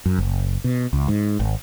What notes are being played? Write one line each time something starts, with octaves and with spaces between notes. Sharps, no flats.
F#2
F#1
B2
C#2
G#2
G#1